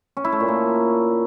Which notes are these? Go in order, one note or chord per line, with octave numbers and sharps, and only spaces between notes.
C#4
E4
A3
A#2
A#3